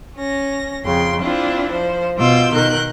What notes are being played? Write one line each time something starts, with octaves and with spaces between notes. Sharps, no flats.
C#4 A#6
F2 C#3 G5 C6
C4 D4 E4 F4
F3 C5
B2 F4 D6 E6 G6
B2 D#3 A#4 F#6 G6